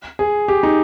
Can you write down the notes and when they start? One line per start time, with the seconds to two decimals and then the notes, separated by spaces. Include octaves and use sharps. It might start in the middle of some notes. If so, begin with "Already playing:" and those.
0.19 G#4
0.48 G4
0.63 D#4